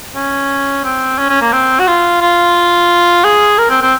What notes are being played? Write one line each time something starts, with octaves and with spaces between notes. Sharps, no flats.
C#4
C4
C#4
C#4
A#3
C4
F#4
F4
F4
G#4
A#4
C4
C4